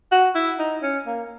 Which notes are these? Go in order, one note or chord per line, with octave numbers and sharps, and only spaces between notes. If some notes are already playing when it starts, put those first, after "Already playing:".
F#4
E4
D#4
C#4
A#3